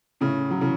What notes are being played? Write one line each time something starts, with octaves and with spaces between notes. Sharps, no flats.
A2 C#3
F#3
C#3 E3